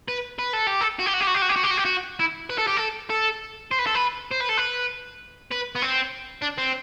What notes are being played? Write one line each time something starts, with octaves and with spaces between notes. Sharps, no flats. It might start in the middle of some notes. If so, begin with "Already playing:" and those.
B4
B4
A4
G4
A4
F#4
G4
F#4
G4
F#4
G4
F#4
G4
F#4
G4
F#4
G4
F#4
E4
B4
A4
G4
A4
A4
C5
B4
A4
B4
C5
B4
A4
B4
B4
B3
C4
D4
C4